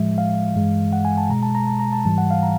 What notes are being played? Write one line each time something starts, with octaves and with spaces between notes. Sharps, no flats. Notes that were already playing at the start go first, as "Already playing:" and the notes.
Already playing: A2 F3 G#3 E5
F5
G2 E3 G#3
F#5
G#5
A5
B2 G#3 A#5
A5
A#5
A5
A#5
A5
G#2 E3 G3 A5
F#5
F5
A#5